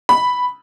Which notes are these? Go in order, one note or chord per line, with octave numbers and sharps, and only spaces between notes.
B5